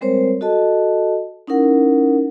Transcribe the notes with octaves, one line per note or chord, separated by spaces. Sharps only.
G3 G#3 C4 A#4 C5 C#5
F#4 A4 D#5 A5
C#4 D#4 E4 A#4 F#5